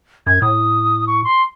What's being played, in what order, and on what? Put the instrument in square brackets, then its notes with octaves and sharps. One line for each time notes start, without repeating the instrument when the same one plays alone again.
[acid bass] F#2 [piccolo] G#6
[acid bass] A2 [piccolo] D#6
[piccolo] C#6
C6